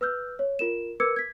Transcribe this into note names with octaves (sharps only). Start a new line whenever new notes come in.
B4 E6 F6 G6
C#5
F4 A#4 E7
A#4 B4 D6 E6 G#6 C#7
G#6 B6